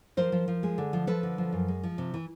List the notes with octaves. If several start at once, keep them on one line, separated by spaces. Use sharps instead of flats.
F3 A#4 C5
F3
F3
G#3
D3
F3
F3 A4 B4
D3
F3
F#2
G#3
F3
C3
E3